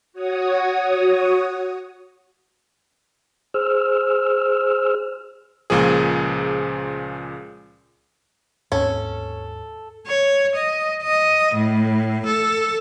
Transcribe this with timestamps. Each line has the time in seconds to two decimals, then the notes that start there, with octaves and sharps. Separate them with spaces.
0.13 F#4 C#5 D#6
3.54 G#4 C5 E6 F6
5.70 C#2 A#2 F3 G#4
8.72 D#2 G#2 C4 C#4 A4
10.07 C#5
10.55 D#5
11.03 D#5
11.54 A2
12.26 A4